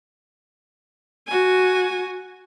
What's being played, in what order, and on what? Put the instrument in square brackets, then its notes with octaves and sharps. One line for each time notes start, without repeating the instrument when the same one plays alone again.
[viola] F#4 G#5